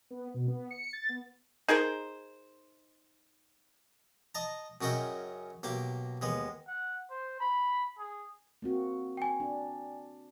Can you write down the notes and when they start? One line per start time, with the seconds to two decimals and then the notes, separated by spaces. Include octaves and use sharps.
0.11 B3
0.34 B2
0.48 B3
0.71 C#7
0.93 A6
1.09 B3
1.68 D#4 G#4 A#4 C5
4.35 D#5 A5 A#5
4.81 F#2 C#3 F#4 A#4 D#5 G5
5.63 B1 A#3 G4 D6
6.22 D#2 G#3 B3
6.67 F#5
7.10 C5
7.40 B5
7.98 G#4
8.62 A#3 C4 F#4
9.17 G5 G#5
9.40 D4